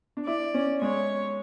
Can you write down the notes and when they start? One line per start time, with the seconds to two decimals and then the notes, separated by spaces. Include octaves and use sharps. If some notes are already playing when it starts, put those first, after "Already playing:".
0.17 D4
0.26 E4 D5
0.54 C#4
0.82 G#3 C#5